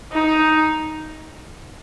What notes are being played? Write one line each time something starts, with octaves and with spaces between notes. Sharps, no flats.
D#4